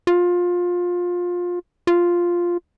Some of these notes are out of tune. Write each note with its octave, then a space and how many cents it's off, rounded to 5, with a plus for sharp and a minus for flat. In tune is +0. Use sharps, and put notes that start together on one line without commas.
F4 +20
F4 +0